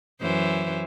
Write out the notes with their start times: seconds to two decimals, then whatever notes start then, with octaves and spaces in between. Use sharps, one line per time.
0.21 F#2 E3 C5